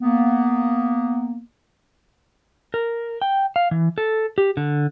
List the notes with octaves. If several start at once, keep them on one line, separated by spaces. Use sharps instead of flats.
A#3 B3
A#4
G5
F5
E3
A4
G4
D3